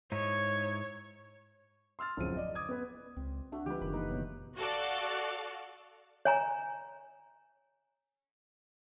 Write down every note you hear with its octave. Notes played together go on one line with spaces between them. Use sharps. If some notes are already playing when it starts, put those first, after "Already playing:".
G#2 D#4 E4 C#5
C6 E6 F6 A6
D1 F#2 F3 C4 G#4 D#7
D5 D#5
D6 D#6 G#6
B3 B4
C#2 C4
A3 D4 F#4
D3 F3 G#3 G4 B4
F#1 D#3 B5
E3 A#3 D#4 B4
B2 F#3 B3
F#4 A4 D5 F5
C#5 G#5 A#5